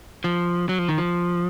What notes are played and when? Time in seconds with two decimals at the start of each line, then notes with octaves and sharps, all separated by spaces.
0.24 F3
0.69 F#3
0.79 F3
0.89 D#3
0.98 F3